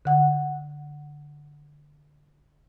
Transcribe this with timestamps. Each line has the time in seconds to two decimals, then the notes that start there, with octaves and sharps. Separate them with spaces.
0.05 D3 F#5